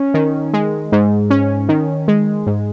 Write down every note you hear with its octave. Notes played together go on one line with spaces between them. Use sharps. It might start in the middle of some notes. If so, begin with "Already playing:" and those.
Already playing: C#4
D#3
G#3
G#2
C#4
D#3
G#3
G#2